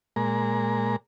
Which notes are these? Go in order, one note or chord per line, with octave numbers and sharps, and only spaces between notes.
A#2 G#3 A#5